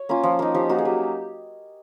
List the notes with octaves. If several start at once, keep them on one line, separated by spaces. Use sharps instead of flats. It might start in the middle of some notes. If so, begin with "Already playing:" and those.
Already playing: C#5
A#3 C#4 F4
F3
A#3 D#4
F3 G4
A#3 D#4 F#4
G#4
F#3 G4